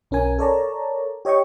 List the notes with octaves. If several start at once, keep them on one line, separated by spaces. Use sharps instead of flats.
B1 C#4 A#4 G#5
A4 A#4 C#5 D5 A5 A#5
G4 C#5 D#5 G5 C#6